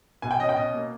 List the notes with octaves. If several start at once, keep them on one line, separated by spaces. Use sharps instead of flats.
B2 G#5
G5
C#4 D#5
G5
B2 D#5
A#3